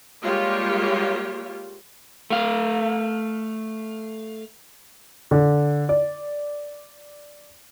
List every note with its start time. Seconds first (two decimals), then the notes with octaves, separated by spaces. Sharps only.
0.23 G3 G#3 A#3 F4 G4 C#5
2.30 A3 F5
5.31 D3
5.89 D5